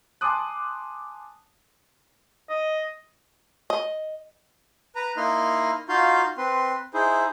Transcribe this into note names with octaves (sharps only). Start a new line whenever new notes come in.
G#5 A5 C6 D6 D#6 F#6
D#5
D#5
B4 A#5
A#3 D#4 E4 D#5 C6 F6
D#4 F4 F#4 F5 C6 G6
C4 B4 C6
D#4 E4 G#4 C5